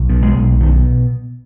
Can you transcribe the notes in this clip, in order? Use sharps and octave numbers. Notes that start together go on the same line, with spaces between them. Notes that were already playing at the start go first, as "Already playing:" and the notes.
Already playing: B1
B2
G#3
B1
B2 D#3